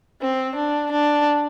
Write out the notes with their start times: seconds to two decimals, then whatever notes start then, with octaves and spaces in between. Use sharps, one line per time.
0.21 C4
0.56 D4
0.92 D4